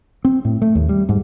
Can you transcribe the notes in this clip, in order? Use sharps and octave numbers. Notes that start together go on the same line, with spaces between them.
C4
A2
A3
D#2
G3
G#2